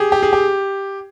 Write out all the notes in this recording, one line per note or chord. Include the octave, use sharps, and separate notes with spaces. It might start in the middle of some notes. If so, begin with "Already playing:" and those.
Already playing: G4 G#4
G4
G#4
G4